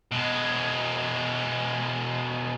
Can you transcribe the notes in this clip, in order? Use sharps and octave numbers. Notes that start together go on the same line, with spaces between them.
B2 G#3